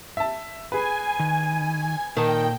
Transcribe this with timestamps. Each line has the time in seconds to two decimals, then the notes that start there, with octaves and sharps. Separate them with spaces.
0.17 E5 A5
0.72 G#4 B4 G#5
1.20 D#3
2.17 A#2 D#3 G5 A5